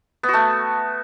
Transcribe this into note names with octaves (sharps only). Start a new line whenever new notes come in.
B3
F#4
A3